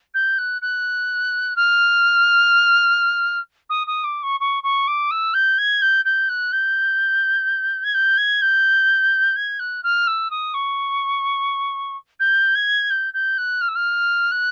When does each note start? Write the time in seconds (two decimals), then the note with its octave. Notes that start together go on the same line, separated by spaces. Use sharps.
0.14 G6
0.38 F#6
0.62 F#6
1.56 F6
3.69 D#6
3.87 D#6
4.04 D6
4.23 C#6
4.40 C#6
4.63 C#6
4.87 D6
5.11 E6
5.34 G6
5.58 G#6
5.82 G6
6.05 G6
6.29 F#6
6.52 G6
7.84 G#6
7.94 G6
8.17 G#6
8.41 G6
9.36 G#6
9.59 F#6
9.83 F6
10.07 E6
10.31 D#6
10.54 C#6
12.20 G6
12.55 G#6
12.90 G6
13.13 G6
13.38 F#6
13.61 F6
13.68 E6
13.75 F6
14.31 F#6